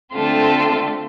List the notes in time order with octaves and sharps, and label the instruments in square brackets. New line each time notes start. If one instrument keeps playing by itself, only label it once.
[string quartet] D3 A3 C4 F4 A4